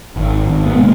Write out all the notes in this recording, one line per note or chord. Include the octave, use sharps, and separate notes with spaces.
G#1
G#1
B3
C3 G#3 A#3